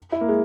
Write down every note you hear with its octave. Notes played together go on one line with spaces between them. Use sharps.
E4
A#3
G#3